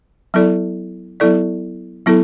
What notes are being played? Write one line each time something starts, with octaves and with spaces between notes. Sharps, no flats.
F#3 B3 E4 A4 D5
F#3 B3 E4 A4 D5
F#3 B3 E4 A4